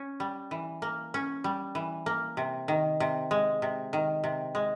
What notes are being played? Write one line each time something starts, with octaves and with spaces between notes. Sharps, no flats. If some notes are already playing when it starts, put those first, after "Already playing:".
Already playing: C#4
G3
E3
A#3
C#4
G3
E3
A#3
C3
D#3
C3
G#3
C3
D#3
C3
G#3